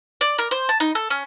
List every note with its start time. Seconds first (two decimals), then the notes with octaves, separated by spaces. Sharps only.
0.21 D5
0.38 A#4
0.51 C5
0.69 A5
0.80 D#4
0.95 A4
1.10 C#4